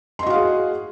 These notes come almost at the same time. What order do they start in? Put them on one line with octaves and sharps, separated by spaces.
C6 D#5 F#4 F5 G#4